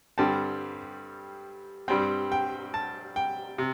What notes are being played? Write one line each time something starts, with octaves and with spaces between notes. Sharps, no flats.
G2 D3 G3 C4 A5
G2 G3 C4 G5
G5
A5
G5
C3